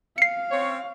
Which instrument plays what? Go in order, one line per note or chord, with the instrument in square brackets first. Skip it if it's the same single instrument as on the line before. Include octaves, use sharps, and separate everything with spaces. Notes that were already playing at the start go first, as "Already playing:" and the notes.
[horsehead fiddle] F5 [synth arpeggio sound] C7 C#7
[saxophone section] C4 C#4 C#5